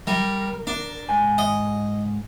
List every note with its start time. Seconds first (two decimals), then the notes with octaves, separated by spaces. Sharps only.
0.07 G3 A#4
0.67 D4
1.09 G#2 G#5
1.38 D#5